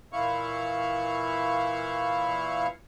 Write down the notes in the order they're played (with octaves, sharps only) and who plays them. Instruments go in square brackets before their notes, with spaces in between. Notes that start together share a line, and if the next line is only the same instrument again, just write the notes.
[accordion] A#2 E3 E4 F5 C#6